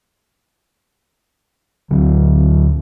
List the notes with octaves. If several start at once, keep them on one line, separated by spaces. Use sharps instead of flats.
D2 D3 F#3